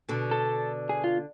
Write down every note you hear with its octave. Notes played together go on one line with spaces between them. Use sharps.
B2 D3
A4
G#4
F4